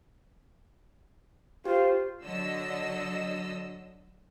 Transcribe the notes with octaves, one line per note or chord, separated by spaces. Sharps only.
F4 G4 C5
D3 F#3 D#5 E6